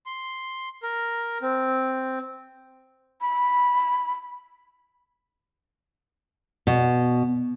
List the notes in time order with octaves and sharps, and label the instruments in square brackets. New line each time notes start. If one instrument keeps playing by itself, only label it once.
[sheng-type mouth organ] C6
A#4
C4
[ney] B5
[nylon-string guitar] B2